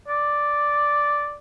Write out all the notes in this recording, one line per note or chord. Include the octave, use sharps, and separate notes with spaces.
D5